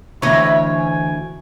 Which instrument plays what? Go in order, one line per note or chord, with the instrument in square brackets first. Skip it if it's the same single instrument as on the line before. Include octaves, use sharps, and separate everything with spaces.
[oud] D2 D#5 [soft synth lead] E3 [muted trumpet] E4 [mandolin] C#5
[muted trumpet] G#5